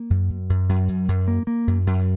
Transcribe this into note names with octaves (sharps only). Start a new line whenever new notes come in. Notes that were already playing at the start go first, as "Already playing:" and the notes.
Already playing: A#3
F#2
F#2
F#2
F#2
F#2
F#2
A#3
A#3
F#2
F#2